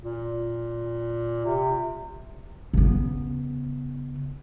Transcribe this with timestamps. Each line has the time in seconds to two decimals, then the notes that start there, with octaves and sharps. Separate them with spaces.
0.01 A#2
1.45 C3
2.74 C#3 B3